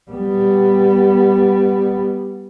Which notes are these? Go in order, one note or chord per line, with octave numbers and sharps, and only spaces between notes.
G3 B3